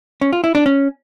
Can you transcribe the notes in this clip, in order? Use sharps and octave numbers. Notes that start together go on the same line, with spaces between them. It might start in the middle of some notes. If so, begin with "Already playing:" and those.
C#4
F4
E4
D4
C#4